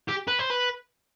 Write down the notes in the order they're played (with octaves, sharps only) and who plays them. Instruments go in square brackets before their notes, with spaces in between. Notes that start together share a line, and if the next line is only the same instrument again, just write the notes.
[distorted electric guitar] G4
B4
C5
B4